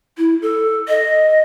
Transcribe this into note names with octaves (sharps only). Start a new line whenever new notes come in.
E4
A4
D#5